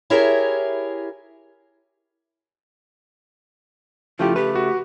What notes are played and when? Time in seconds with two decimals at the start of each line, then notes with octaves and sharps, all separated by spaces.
0.10 E4 G4 G#4 A#4 C#5 E5
4.19 C#3 F3 A3 E4 F4 G4
4.36 G4 B4
4.55 F#4